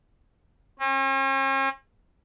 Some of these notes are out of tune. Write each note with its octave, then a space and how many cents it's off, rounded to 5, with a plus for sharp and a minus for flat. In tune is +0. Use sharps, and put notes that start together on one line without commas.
C#4 -45